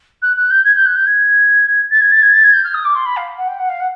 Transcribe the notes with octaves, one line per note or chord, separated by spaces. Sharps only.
F#6
F#6
G6
G#6
G6
F#6
G6
G#6
A6
G#6
A6
G#6
A6
G#6
G6
F6
D#6
D6
C6
B5
F5
F#5
G5
F#5
F5
F#5